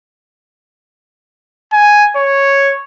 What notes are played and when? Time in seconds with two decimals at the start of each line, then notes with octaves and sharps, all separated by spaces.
1.73 G#5
2.17 C#5